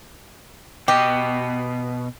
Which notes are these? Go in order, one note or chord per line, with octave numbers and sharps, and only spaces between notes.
B2 G4 D#5